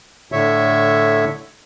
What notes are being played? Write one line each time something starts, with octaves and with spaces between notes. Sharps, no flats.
A2 D3 C#5 E5